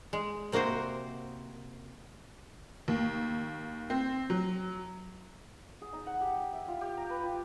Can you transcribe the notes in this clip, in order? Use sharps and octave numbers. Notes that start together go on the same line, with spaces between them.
G#3
C3 A#3 F#4 A#4 C5
D#2
C4
F#3
G#4
D#4
F#5
G4
E5
F4
G4
A#5
B4
F4